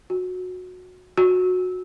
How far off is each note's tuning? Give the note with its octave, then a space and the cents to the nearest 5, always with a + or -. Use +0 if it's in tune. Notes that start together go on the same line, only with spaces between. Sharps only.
F#4 -20
F#4 -20